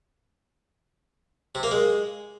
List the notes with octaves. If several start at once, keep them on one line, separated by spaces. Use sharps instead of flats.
C3
A#3
G#3